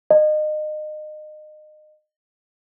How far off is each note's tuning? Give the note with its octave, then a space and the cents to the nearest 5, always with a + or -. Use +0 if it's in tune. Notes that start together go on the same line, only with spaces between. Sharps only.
D#5 -30